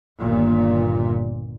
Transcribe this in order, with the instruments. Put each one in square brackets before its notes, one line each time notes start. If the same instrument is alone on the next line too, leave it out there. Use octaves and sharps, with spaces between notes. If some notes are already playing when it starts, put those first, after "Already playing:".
[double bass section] G1 D#2 A#2